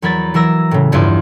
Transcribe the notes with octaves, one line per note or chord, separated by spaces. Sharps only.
E2 F#3 A#4 B5 G#6 A6
E3 F#3 A#4 E6 A#6
A2 C#3
E2 G2 E4 F4 C5 G#6